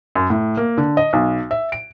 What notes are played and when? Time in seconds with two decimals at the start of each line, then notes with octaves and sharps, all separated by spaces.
0.15 F#2
0.30 A2
0.57 A#3
0.78 D3
0.97 D#5
1.13 B1
1.51 E5
1.72 D7